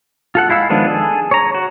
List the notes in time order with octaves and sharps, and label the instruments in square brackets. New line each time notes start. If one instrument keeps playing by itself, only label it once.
[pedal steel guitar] F4 A4 F#5
G#3 E4 F5 E6
D#3 F3 G#3 B3 D4
G#4 A4
C#5 A#5
F#4